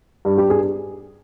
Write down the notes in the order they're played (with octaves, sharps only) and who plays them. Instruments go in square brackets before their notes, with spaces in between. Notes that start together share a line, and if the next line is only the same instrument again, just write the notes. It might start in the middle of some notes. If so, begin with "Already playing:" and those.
[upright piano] G2
G4
G2
G#4